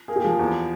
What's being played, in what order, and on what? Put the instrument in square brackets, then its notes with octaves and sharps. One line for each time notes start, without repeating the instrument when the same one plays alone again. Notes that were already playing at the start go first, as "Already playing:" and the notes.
[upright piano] A#3 [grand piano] G#4
[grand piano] G4
[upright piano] F3 [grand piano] G#4
[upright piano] E2